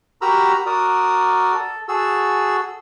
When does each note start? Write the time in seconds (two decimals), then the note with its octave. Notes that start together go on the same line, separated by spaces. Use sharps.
0.22 F#4 G4 A#4 A#5 B5 E6
0.66 F#4 A#4 D5 D#6
1.52 A4
1.88 F#4 G#4 A4 E6